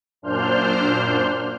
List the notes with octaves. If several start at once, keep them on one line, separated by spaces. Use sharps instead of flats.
F#2 A#2 D4 C5 F6 G6